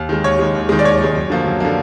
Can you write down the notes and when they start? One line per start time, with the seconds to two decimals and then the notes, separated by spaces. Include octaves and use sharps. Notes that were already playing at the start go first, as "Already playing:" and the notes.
Already playing: D#2
0.09 D#3 G#3
0.24 D#2 C#5
0.39 D#3 G#3
0.55 D#2
0.69 D#3 G#3
0.79 D5
0.84 D#2 C#5
1.00 D#3 G#3
1.15 F#2
1.30 D3 F3 A#3
1.45 F#2
1.60 D3 F3 A#3